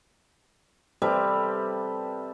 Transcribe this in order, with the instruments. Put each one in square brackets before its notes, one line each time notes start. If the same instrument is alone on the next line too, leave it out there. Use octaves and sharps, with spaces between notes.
[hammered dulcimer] C3 G3 A4 B4